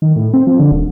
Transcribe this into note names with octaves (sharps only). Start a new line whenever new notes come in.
D#3
A2
C4
F3
D3
D#1